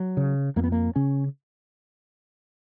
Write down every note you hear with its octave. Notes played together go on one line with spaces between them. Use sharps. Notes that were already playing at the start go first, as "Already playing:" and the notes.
Already playing: F#3
C#3
F2 A#3
B3
A#3
C#3 C#4